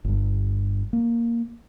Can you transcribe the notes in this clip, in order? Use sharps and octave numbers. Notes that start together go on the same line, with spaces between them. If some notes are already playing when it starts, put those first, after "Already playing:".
G1 G2
A#3